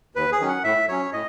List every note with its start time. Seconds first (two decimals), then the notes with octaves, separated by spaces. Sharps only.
0.15 D#2 B4
0.32 G#4
0.40 D#3 F#3 C#4
0.48 F#5
0.64 A2 E5
0.88 F#3 C#4 C#5
1.13 A2 D#5